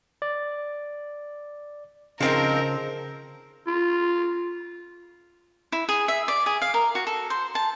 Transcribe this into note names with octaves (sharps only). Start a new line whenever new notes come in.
D5
C#3 F3 C4 D#4 A#4
F4
E4
G#4
E5
D5
G#4
F5
A#4
F#4
A4
C5
A5